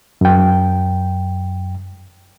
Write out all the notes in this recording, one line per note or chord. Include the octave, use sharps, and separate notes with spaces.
F#2 G5